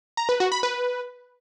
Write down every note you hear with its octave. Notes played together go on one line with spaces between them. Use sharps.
A#5
B4
F#4
B5
B4